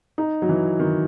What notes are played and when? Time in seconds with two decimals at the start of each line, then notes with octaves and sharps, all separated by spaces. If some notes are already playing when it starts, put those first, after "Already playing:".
0.18 D#4
0.42 F#3
0.49 E3
0.79 D#3